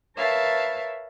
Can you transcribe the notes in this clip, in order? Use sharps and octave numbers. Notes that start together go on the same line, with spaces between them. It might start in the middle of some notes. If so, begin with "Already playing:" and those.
A#4 B4 C#5 E5 F5 A5